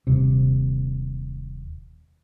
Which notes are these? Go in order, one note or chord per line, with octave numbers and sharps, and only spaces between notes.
D#1 C3